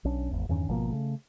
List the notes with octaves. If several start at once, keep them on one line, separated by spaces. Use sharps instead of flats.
B1 C#4 D4
G#1 E2
E2 G2 D#3 C#4
G#1 B2 F3 A#3
C#3 A3